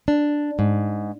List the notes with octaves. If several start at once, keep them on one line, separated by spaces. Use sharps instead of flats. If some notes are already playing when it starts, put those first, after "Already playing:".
D4
G#2